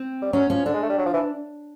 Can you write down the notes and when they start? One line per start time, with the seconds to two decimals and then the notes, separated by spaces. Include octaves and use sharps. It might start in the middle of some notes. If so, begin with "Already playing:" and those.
Already playing: C4
0.22 G3
0.33 F#3 C#4
0.50 F3 C#4
0.65 D3 D4
0.74 G#3
0.82 A3
0.90 G3
0.98 F#3
1.06 F3
1.14 E3